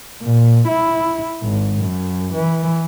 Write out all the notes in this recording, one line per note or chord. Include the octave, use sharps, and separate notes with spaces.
A#2
E4
G#1
F#2
E3